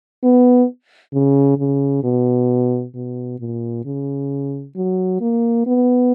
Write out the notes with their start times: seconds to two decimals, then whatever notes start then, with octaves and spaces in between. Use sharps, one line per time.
0.23 B3
1.13 C#3
1.59 C#3
2.04 B2
2.95 B2
3.40 A#2
3.85 C#3
4.76 F#3
5.21 A#3
5.66 B3